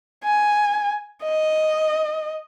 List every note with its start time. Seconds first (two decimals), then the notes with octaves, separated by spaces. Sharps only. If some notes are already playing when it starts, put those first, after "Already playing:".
0.24 G#5
1.24 D#5